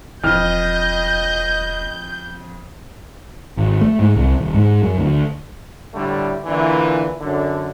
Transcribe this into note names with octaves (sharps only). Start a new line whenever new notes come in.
E1 F2 D#5 F6 G6
G#1
A3
G#2
C2
D#1
G#2
F#2
D2
A2 D3 G3 A3
A#2 D3 E3
F#2 D3